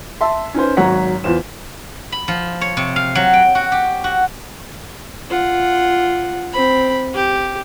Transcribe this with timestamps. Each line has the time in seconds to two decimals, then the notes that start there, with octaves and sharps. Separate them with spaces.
0.21 E5 A5 C6
0.54 C#4 D#4 B4 C5
0.77 G#1 F#3 C#5 F#5 A#5 B6
1.24 E2 F4 B4 C5 E7
2.12 B5
2.28 F3
2.61 C#5
2.77 C3
2.96 F5
3.15 F#3
3.34 G5
3.55 F#4
3.72 G4
4.04 F#4
5.30 F4 F#5
6.53 C4 B5
7.14 G4